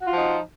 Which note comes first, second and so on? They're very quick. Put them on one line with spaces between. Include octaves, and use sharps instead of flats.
F#4 F4 F3 D#4